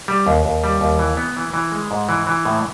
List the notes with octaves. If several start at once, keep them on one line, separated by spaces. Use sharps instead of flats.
G3
D#2
D#2
G3
D#2
E3
B3
E3
E3
G#3
G#2
E3
E3
A2